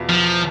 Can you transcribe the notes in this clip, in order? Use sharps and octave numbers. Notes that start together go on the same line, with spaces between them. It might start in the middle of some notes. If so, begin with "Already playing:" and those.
Already playing: E2 B2 B3 F4
F3